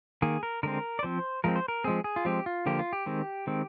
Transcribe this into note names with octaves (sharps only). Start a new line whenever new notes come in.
D#3 A#3 G#4
A#4
D3 G#3 C4 A#4
D5
F3 C4 C5
F3 G#3 C4 A#4
C5
A#4
F3 G#3 C4 G#4
G#4
F4
F3 G#3 C4 G4
F4
D3 F3 A#3 G4
F4
G4
D#3 G#3 C4
D#3 G#3 C4